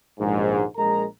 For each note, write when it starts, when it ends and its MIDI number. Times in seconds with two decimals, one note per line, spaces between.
0.20 0.64 34
0.20 0.64 39
0.20 0.64 44
0.77 1.05 34
0.77 1.05 56
0.77 1.05 70
0.77 1.05 82